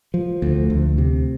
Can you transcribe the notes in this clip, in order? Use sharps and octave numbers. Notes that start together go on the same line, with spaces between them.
F3
D2
D2
C3